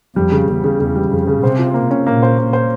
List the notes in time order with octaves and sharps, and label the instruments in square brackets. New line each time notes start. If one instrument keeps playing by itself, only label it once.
[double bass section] F2 [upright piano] G3
[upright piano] C#3
[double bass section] E2 [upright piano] C#3
[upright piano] C#3
[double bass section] E2 [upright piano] C#3
[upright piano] G3
[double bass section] F2 [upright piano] C#3
[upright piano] C#3
[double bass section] C3 [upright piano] C5
[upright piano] F4
A#3
C#4
[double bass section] A#2 [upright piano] A#3
[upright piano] C5
A#3
C5